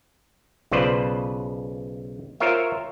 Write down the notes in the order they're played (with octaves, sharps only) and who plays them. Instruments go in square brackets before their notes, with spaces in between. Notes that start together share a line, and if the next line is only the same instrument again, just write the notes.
[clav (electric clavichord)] B1 C#3 F4 B4 C5 D5
F4 A#4 C5 C#5 E5